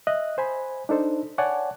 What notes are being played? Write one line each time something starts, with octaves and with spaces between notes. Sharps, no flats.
D#5 E5 F#6
C5 G#5 B5
D4 D#4 A4 C5
C#5 D5 F#5 G#5 A5